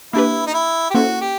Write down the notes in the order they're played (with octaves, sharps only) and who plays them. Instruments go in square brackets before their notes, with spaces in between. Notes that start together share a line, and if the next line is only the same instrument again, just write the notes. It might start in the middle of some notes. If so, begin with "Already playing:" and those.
[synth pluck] A#3 D4 G4 B4 [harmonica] E4
[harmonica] D#4
E4
G4
[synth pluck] A#3 C#4 E4 A4 C5 [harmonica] F#4
[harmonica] G4